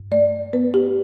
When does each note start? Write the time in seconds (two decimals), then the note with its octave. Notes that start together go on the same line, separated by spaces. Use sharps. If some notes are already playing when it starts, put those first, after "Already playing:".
Already playing: G2
0.11 A3 D5
0.53 B3 B4
0.74 G4